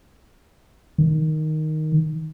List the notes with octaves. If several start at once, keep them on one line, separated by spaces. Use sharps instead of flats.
D#3